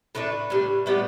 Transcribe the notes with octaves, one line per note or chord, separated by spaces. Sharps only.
A2 A3 D4 B4
A2 G3 D4
A2 G3 B3 D4 B4